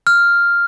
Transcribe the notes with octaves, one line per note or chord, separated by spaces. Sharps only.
F6